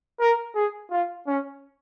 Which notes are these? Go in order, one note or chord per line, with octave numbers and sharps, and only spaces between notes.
A#4
G#4
F4
C#4